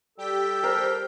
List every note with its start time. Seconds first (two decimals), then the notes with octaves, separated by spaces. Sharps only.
0.18 G3 G4 A4 G5 B6
0.64 A#4 C5